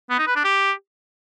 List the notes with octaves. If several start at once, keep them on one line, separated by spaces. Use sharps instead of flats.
B3
D#4
B4
D4
G4